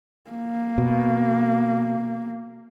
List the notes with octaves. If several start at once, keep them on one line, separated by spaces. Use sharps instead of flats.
A#3
B2